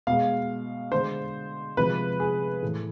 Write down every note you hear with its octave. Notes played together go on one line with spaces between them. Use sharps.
B2 G#3 F5
D3 G#3 C5
C3 F3 G#3 B4
G#4
A2 E3 A3